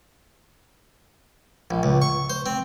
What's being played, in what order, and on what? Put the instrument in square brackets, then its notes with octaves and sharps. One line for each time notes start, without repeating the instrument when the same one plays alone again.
[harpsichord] A#1
C#2
C#6
C5
C4